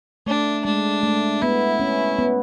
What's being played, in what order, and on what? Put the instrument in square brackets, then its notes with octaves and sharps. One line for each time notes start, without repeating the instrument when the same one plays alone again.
[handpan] A3 [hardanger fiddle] D4
[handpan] G#3 [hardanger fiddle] D4
[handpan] A3
[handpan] B3 [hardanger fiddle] E4
[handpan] C#4
B3